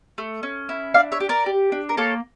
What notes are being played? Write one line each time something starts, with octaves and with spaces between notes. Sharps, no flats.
A3
C#4
E4
D4 D5 F5
C#5 E5
G4
A#4 D5
G4
D4
A#4
A#3 A4 C#5